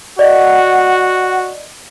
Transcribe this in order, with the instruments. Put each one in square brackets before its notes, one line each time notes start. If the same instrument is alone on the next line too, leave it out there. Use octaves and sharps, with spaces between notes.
[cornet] F#4 [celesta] D5 D#5 [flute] F#5